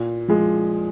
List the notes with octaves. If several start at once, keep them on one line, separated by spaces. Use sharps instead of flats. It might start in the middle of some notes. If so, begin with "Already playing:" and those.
Already playing: A#2
F3 G#3